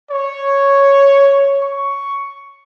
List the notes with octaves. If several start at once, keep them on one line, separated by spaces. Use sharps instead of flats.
C#5
C#6